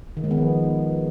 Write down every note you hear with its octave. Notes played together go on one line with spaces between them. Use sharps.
D#3
G#3
B3
F3